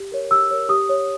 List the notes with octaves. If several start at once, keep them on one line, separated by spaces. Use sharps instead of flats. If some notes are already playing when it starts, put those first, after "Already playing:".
Already playing: G4
A#4 C#5
G4 E6
A#4 C#5
G4 D#6
C#5